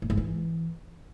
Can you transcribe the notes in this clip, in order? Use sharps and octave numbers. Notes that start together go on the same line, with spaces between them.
A2
G#2
E3